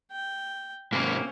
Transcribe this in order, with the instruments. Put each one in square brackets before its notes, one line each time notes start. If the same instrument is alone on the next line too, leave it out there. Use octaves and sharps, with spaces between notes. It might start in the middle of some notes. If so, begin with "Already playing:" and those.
[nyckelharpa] G5
[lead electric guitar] G#2 C3 [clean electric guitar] A#3 [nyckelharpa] C4 C#4